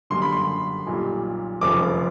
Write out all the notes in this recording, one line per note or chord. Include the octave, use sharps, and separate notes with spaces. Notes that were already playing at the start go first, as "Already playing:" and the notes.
G1 F#2 D3 G3 A#3 C6
B5
C6
B1 A#2 G3
F1 F2 C#3 F3 D6